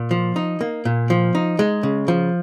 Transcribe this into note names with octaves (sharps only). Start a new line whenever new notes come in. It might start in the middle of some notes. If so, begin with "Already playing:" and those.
Already playing: A#2
F3
D#4
A#3
A#2
F3
D#4
G#3
C#3
F3